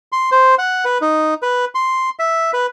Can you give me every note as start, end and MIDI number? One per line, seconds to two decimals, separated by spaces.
0.12 0.30 84
0.32 0.55 72
0.58 0.85 78
0.85 0.98 71
1.01 1.34 63
1.42 1.65 71
1.75 2.10 84
2.19 2.51 76
2.53 2.66 71